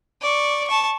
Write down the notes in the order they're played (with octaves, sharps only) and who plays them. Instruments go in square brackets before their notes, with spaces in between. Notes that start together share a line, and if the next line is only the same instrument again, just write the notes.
[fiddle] D5 C#6
A5 C#6